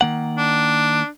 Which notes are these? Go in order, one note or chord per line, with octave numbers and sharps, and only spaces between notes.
D#3 A#3 F#5
D4